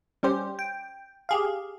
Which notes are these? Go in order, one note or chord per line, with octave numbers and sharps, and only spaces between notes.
G3 C#4 G4 C5
G5
G4 G#4 F5